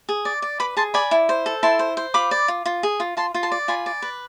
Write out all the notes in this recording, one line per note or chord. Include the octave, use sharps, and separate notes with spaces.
G#4
D5
D5
B4 B5 D6
G#4 A5 C6
D5 G#5 B5
E4
C5
A4
E4 A5 C6
C5
C5
F4 B5 D6
D5
F4
F4
G#4
F4
F4 A5 C6
F4
A5 C6
D5
F4 G#5 B5
D5
B4